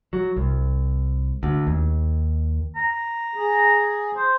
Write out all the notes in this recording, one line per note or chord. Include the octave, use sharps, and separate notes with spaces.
F#3
C2
D2
D#2
A#5
G#4
C5